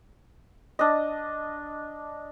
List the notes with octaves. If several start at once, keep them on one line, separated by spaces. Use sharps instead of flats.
D4 D#5